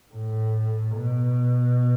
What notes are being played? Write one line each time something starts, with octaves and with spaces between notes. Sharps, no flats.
A2
B2